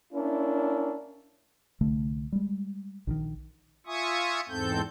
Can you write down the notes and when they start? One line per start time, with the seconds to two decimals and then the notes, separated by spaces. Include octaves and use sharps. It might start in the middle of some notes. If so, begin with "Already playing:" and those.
0.13 A#3 C#4 D4 E4
1.81 C2 D3 A3
2.32 G3 G#3
3.07 A#1 D3 D#3
3.86 F4 E5 G#5 C#6 D#6
4.49 E2 G#2 C4 A4 G6